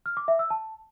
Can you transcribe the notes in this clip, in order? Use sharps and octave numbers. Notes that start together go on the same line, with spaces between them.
F6
D6
E5
E6
A5